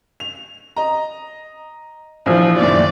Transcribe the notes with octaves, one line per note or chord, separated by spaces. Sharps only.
F7
D#5 A#5
A#1 E3 F3
F#1 A#2 D#3 D5